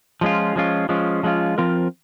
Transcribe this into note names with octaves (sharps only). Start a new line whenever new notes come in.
F3 G#3 C#4 F4
F3 G#3 C#4 F4
F3 G#3 C#4 F4
F3 G#3 C#4 F4
F3 C4 F4 A#4